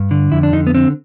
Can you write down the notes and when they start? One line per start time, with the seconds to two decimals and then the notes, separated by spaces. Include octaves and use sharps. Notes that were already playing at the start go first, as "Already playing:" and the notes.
Already playing: G2
0.11 D3
0.32 F2 E4
0.43 D4
0.53 D3 D#4
0.67 B3
0.75 D3 C4